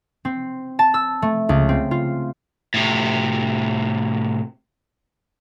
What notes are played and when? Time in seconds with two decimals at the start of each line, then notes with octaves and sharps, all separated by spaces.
0.25 C4
0.79 A5
0.94 E6
1.22 A3
1.49 C#2
1.69 C4
1.91 F4
2.74 A2 C3